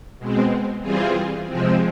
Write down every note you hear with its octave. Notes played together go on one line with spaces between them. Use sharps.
B2 G#3 C4
E3 G3 C4 F4 G#4
C3 F3 G#3 C4